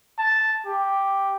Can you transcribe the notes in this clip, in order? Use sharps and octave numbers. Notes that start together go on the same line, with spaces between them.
A5
G4